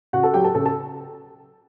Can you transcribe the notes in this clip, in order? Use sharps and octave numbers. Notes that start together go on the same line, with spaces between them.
C#3 F#4 F#5
A4 A5
F#3 G4 G5
A4 A5
C#3 A4 A5
A4 A5